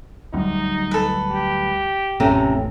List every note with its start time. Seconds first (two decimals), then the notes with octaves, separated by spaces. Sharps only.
0.34 D2 F#3 G3 D#4
0.91 A4 B4
1.31 G4
2.20 A1 F2 A2 C3 A3 C#4 A#5